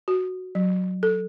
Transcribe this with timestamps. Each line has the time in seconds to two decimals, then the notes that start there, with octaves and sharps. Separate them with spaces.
0.08 F#4
0.55 F#3
1.03 A4